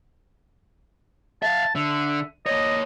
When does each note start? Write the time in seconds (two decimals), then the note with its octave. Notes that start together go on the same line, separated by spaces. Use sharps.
1.42 E5 F5 A5
1.75 D3 E5
2.46 A#3 C#5 D#5